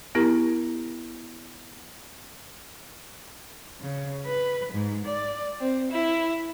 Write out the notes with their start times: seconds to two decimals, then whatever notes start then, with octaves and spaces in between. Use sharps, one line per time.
0.15 B3 E4 G4 A#4 A#5
3.81 C#3
4.27 B4
4.72 G#2
5.05 D5
5.61 C4
5.92 E4